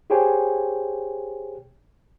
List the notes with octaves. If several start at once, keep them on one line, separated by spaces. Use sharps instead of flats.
G4 G#4 C5 C#5 G5 G#5